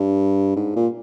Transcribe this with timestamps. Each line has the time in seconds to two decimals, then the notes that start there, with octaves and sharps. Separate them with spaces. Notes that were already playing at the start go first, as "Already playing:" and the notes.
Already playing: G2
0.56 G#2
0.76 A#2